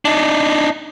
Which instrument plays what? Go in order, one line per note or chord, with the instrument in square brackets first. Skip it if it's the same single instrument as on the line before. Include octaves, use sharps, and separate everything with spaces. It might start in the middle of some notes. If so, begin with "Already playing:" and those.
[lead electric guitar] D4 D#4